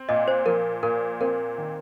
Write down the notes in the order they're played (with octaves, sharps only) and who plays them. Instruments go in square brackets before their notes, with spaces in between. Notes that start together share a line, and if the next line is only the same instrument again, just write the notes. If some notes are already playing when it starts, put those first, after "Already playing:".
Already playing: [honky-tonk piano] C4
[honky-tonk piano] A#2 [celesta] D#5
[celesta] C5
[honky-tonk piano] F3 [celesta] A#4
[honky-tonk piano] A#2 [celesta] A#4
[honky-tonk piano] C4 [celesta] A#4
[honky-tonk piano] D#3